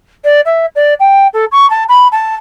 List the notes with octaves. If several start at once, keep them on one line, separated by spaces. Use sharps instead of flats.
D5
E5
D5
G5
A4
C#6
A5
B5
A5